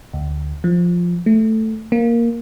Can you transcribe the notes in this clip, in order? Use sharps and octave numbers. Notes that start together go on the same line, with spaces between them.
D2
F3
A3
A#3